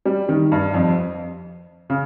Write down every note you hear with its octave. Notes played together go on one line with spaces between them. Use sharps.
G3
D#3
G2
F2
C#3